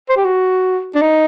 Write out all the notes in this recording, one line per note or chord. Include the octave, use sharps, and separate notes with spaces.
C5
G4
F#4
D4
D#4